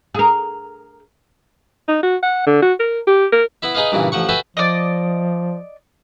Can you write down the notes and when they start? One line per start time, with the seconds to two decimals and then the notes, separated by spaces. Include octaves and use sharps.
0.14 G#4 A#4
1.88 D#4
2.03 F#4
2.23 F#5
2.46 D3
2.62 F#4
2.79 A#4
3.07 G4
3.32 A#4
3.62 B3 E4 E5
3.75 D#4 G#4 B4 D#5 F5
3.92 G2 A#2 C#3 E3
4.12 A1 F3 F#5 C#6
4.29 F#4 A4 B4 E5 G5 G#5
4.57 F3 D5 D#5